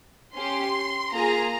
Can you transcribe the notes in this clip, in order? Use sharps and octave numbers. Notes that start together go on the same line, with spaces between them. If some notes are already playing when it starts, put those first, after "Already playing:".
C#4 G4 C6
A#3 F4 G#4 A#5